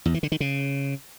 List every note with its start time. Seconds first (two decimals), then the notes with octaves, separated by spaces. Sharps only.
0.05 E2
0.14 E3
0.23 D3
0.32 D#3
0.40 C#3